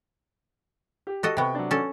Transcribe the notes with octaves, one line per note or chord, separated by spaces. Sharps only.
G4
F#4 A4 D#5
C3 B3 G5 B5 C#6
F#3 D4
C#4 A4